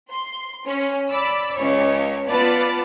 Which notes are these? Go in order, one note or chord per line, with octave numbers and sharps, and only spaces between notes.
C6
C#4
D5 B5 E6
C#2 C#5
B3 F4 B4 D5 A5